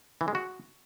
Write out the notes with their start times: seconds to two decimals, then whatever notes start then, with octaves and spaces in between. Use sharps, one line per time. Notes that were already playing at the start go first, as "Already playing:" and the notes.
0.21 E3
0.28 G#3
0.35 F#4